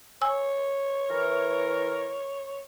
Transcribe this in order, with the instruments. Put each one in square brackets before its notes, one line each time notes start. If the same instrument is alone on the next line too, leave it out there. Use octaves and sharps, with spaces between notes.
[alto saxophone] C#5 [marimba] G#5 E6
[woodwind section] E3 A#4